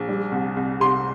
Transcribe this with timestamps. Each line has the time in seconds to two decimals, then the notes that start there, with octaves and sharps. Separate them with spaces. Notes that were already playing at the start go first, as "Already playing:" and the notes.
Already playing: A#1
0.09 G3
0.32 C2
0.57 C2
0.80 C3 C6